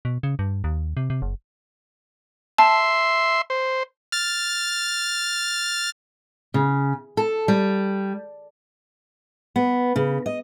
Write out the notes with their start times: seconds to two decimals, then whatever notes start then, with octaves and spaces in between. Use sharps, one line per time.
0.05 B2
0.23 C#3
0.39 G2
0.64 D#2
0.97 C3
1.10 C3
1.22 F#1
2.58 E5 A5 C6
3.50 C5
4.12 F6 A6
6.54 C#3
7.17 A4
7.48 G3
9.56 B3
9.96 C#3
10.26 D#5